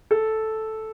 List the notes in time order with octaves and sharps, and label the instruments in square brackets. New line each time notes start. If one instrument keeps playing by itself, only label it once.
[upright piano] A4